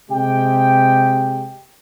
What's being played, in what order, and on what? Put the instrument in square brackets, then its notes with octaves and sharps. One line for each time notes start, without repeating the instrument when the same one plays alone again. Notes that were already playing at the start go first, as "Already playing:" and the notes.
[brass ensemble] C3 G#3 G4 G5